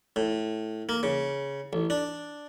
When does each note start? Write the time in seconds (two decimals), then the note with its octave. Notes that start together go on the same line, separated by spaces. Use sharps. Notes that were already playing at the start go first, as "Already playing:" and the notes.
0.16 A2
0.89 A#3
1.03 C#3
1.73 A1
1.90 D4